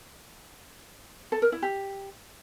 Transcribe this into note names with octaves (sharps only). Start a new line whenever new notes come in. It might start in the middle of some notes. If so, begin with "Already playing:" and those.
A4
A#4
E4
G4